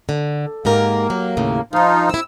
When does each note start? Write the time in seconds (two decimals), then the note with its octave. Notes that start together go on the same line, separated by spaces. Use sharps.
0.09 D3
0.65 G#2 A#3 G4 A#4
1.10 F#3
1.37 D#2 A2 C#3
1.73 E2 G2 F3 D#4 F4
2.09 C4 E4 E6